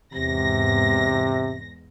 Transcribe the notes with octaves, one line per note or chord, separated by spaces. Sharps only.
E2 G#2 C3 A#6